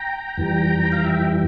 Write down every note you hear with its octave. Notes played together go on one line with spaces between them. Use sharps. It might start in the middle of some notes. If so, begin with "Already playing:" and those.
Already playing: G5 A#5
F2 E3 G3
F5
E5 G5